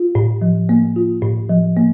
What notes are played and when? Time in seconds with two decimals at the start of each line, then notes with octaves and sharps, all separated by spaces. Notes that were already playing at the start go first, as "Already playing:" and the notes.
Already playing: F4
0.15 A2
0.42 F3
0.69 A#3
0.96 F4
1.22 A2
1.49 F3
1.77 A#3